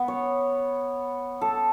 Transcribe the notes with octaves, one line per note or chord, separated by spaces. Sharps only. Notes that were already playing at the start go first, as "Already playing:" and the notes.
Already playing: B3
C#5
A4